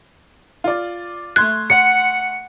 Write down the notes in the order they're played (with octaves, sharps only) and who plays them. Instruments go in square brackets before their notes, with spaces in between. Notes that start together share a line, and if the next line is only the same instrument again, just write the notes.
[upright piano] F4 D5
[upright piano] A3 C6 G#6 [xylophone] F#6
[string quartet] F#5 [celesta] C#7